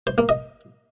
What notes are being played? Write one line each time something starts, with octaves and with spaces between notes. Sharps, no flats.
C5
A#3
D#5